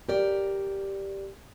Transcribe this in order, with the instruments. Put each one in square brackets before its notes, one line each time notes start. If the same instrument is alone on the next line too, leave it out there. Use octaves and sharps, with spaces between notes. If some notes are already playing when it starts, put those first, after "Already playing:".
[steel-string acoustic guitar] G4 A#4 D5